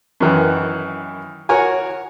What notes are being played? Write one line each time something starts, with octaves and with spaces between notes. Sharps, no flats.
F#2 D#3 E3
F#4 A#4 C#5 F#5 G#5